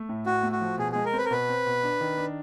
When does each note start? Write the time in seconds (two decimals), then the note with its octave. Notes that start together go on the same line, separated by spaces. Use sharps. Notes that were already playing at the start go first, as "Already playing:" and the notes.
Already playing: A3
0.09 A2
0.26 A2 F#4
0.43 A3
0.52 F#4
0.61 F3
0.78 B2 G#4
0.92 G#3 G#4
1.05 A#4
1.13 C4
1.18 B4
1.25 A#4
1.31 B2 B4
1.49 C4
1.66 B2
1.83 D4
2.01 D#3
2.18 D4